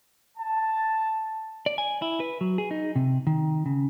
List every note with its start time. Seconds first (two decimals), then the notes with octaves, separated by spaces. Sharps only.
0.37 A5
1.66 D5
1.78 G#5
2.02 E4
2.20 B4
2.41 F#3
2.58 G#4
2.71 D#4
2.96 C3
3.27 D#3
3.66 C#3